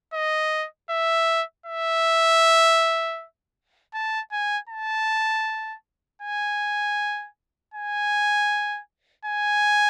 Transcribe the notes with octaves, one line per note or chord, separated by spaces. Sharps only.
D#5
E5
E5
A5
G#5
A5
G#5
G#5
G#5